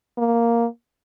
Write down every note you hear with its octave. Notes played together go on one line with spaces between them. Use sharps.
A#3